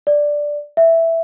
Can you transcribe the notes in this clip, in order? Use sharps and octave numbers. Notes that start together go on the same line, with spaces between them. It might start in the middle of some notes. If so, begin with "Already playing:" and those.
D5
E5